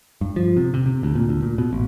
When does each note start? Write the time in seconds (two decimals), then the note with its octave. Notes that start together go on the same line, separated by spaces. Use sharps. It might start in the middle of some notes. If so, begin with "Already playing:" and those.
0.21 G2
0.36 F3
0.57 C3
0.74 C3
0.86 C3
1.03 D2
1.15 A#2
1.29 D2
1.43 A#2
1.58 B2
1.73 A1